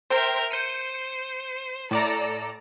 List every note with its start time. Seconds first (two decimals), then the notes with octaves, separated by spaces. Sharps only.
0.10 A#4 C5 E5 G5 F6
0.51 C5 G6 C#7 D#7
1.91 A2 A4 D5 A#5